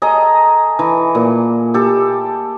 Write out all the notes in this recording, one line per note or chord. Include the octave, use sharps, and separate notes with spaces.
G#4 A4 D#5 A#5
E3
A#2
G4 A4